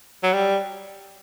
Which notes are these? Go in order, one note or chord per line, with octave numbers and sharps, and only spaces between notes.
F#3
G3